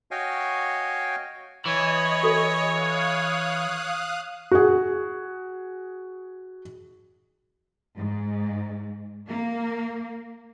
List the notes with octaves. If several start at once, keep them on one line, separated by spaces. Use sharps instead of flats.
F#4 C#5 D#5 F5 G5 G#5
E3 C#5 D#5
F#4 A4 B4
F5 D#6 F#6
F#4 G#4
G#2
A#3